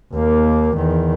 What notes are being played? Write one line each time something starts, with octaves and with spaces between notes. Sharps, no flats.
D#2 A#3
E2 D#3